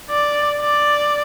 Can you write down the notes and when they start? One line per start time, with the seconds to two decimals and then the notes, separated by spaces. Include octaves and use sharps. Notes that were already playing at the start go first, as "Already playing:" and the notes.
0.11 D5
0.60 D5